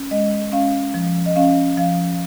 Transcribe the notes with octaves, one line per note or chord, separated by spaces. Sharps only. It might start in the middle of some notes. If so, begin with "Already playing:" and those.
Already playing: C#4
G#3 D#5
C#4 F5
F3
D#5
C#4 F5
F3 F5